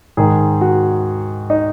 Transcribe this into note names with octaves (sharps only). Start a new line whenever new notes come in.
G#2 D#3 G#4
F#4
D#4